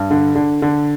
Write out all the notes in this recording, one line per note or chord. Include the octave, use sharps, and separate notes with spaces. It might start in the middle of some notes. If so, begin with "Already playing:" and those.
Already playing: G2
D3
D3
D3